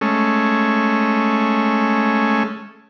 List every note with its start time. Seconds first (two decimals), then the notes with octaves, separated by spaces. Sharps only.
0.01 G#3 A3 C#4